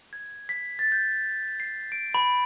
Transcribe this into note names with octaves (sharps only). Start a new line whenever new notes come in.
G#6
B6
A6
G6
C7
D7
B5